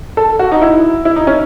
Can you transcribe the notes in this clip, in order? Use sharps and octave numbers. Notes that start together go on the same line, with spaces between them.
A4
F#4
D#4
E4
E4
D#4
C#4